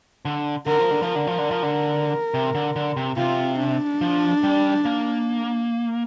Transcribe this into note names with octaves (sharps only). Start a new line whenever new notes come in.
D3
D3 A#4
F3
D3
F3
A#4
D3
F3
D3
F3
D3
C3
D3
D3
C3
C3 F4
D4
F3
G3
A#3